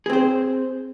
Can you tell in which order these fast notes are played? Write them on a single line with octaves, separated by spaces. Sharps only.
G#4 C4 C5